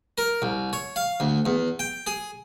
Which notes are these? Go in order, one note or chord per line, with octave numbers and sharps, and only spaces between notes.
A#4
C2
C#5
F5
D2
E2
G5
G#4